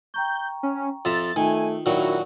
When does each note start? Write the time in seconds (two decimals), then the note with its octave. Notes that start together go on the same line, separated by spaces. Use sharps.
0.14 G5 A#5 C#6 G6
0.63 C#4
1.05 F2 E5 A#5 C6 A6
1.36 D#3 A3 D#4 F4 G#5
1.86 A#2 D#3 F#3 D4 E4 F#4 A#4